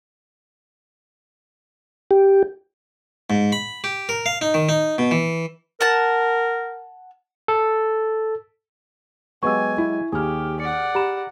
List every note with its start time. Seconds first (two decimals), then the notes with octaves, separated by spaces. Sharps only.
2.11 G4
3.30 G#2
3.52 B5
3.84 G4
4.09 A#4
4.26 F5
4.41 D#4
4.54 D#3
4.69 D#4
4.98 B2
5.11 E3
5.81 A#4 F#5 A5
7.48 A4
9.43 F#3 G#3 B3 G4 G#5 C#6 E6
9.78 E4
10.12 D#2 G4 G#4 F6
10.60 D5 F#5 C#7
10.95 G4 A#5 B5 E7